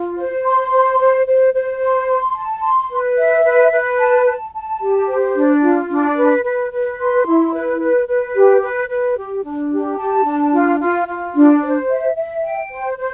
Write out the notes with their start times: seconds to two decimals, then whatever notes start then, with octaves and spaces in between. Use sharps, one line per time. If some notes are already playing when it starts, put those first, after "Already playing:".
Already playing: F4
0.17 C5
0.44 C6
0.71 C5
0.99 C5
1.26 C5
1.53 C5
1.80 C6
2.07 C6
2.35 A5
2.62 C6
2.90 B4
3.16 E5
3.44 B4
3.71 B4
3.98 A5
4.25 A5
4.53 A5
4.80 G4
5.08 C5
5.35 D4
5.62 F4
5.89 D4
6.16 B4
6.44 B4
6.71 B4
6.98 C6
7.26 E4
7.53 B4
7.80 B4
8.07 B4
8.35 G4
8.62 B4
8.89 B4
9.16 G4
9.44 D4
9.71 G4
9.98 A5
10.25 D4
10.53 F4
10.80 F4
11.08 F4
11.35 D4
11.62 C5
11.89 E5
12.16 E5
12.44 G5
12.71 C5
12.98 C5